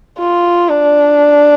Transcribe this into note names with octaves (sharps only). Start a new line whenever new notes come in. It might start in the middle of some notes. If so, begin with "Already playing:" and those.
F4
D4